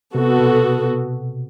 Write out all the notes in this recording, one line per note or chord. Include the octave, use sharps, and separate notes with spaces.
C3 B3 F#4 A4
B2